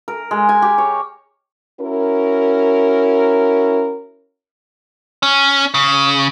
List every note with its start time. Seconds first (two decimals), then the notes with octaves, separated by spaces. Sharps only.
0.08 A#4
0.31 G#3
0.49 G#5
0.62 G4
0.78 C#5
1.80 C#4 E4 F#4 A#4
5.23 C#4
5.74 C#3